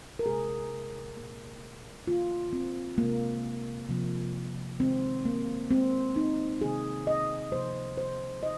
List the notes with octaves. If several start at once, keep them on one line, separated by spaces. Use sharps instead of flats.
A#4
C3 G#3 G#4
A#2 A#3
D#3 A#3 F4
C4
C3 G#3 A#3
C3 F3 A#3
D#3 G#3 C4
A#3
C3 G#3 C4
D#4
C3 D#3 A#3 G#4
D#5
C3 F3 A#3 C5
C5
D#5